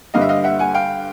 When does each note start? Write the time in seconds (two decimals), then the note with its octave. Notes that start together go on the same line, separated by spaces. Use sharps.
0.14 G2 D3 G3 D#5 F5
0.21 E5
0.29 D#5 F5
0.44 E5 F#5
0.59 F#5 G#5
0.74 F5 G5